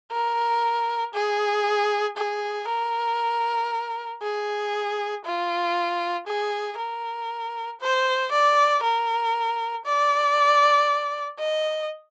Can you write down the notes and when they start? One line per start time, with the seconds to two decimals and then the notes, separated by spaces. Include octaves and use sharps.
0.12 A#4
1.14 G#4
2.17 G#4
2.68 A#4
4.22 G#4
5.25 F4
6.27 G#4
6.78 A#4
7.81 C5
8.32 D5
8.83 A#4
9.85 D5
11.39 D#5